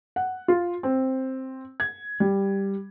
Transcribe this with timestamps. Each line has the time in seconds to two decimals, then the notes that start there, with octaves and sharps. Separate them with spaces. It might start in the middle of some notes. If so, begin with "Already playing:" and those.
0.16 F#5
0.48 F4
0.83 C4
1.80 G#6
2.20 G3